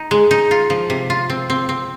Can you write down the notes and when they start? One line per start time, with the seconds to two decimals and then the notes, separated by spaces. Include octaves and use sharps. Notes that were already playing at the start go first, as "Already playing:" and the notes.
Already playing: D#4
0.11 G#3
0.31 D#4
0.51 F4
0.70 F3
0.90 C3
1.10 F4
1.30 C4
1.50 C4
1.69 C4